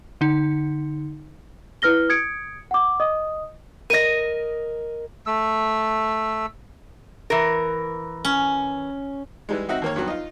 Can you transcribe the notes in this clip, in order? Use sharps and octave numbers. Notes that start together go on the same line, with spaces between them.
D3 D#4
E4 B4 F6 A#6 G7
D#6 G#6 C#7 D7
F#5 D6
D#5 D#6
A#4 D#5 A#6 D#7
A3 E6
E3 A#4
C#4
E3 G3 G#3
C4 D#4 F#4 E5 F#5
D#2 A#3 C#5
G2 F#3 B3
D#4 F4